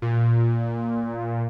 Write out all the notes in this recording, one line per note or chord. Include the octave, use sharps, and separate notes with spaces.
A#2